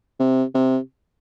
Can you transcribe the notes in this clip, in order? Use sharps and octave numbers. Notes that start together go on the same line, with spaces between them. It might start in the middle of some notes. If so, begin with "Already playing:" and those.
C3
C3